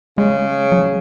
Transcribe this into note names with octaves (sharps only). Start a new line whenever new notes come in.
C#3 G#3
F#3